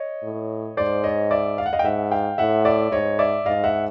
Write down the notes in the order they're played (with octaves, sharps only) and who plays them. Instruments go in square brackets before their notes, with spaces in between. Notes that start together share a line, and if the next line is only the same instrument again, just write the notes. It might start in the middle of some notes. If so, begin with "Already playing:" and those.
Already playing: [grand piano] C#5 D#5
[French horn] A2
[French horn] G#2 [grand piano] C5 D5
[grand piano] C#5 D#5
D5 E5
F5
F#5
D#5 F5
G5
[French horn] G#2 [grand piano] E5 F#5
[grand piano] F5 G5
[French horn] A2 [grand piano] E5 F#5
[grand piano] D5 E5
[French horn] G#2 [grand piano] C#5 D#5
[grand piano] D5 E5
[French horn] G#2 [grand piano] D#5 F5
[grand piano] E5 F#5